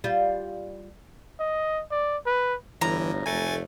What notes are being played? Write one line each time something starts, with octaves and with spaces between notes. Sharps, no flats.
G3 F4
D#5
D5
B4
G1 A2 E3 A#5
F1 A3 G#5 G#6 A6